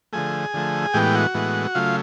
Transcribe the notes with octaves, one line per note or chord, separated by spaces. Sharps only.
D3 F3 A3 G#4 G#5
D3 F3 A3
A2 E3 G#3 B3 G4 G5
F#4 F#5
A2 E3 G#3 B3
C#3 F#3 A3 F4 F5